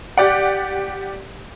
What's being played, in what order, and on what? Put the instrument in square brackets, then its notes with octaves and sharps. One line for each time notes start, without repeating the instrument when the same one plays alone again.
[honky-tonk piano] G4 D5 F#5